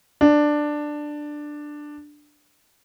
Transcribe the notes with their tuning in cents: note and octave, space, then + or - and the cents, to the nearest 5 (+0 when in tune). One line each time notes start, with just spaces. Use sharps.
D4 +10